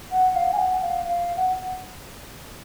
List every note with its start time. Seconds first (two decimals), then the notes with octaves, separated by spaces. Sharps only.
0.12 F#5
0.36 F5
0.53 G#5
0.58 F#5
0.82 F5
1.05 F5
1.37 F#5